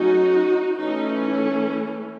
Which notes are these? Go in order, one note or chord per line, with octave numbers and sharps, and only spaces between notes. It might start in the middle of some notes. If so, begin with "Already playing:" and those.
Already playing: F#3 A3 C#4 D#4 F#4
E3 A3 C#4 D#4